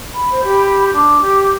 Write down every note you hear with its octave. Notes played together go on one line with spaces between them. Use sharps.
B5
C5
G4
D4 D6
G4